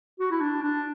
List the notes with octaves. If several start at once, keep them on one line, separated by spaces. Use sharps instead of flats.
F#4
E4
D4
D4